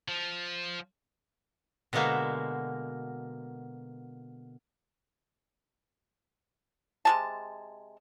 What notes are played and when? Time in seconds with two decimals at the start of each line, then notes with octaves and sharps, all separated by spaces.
0.08 F3
1.93 B2 D3 G#3 A#3 F#4 E5
7.05 C3 G#3 A5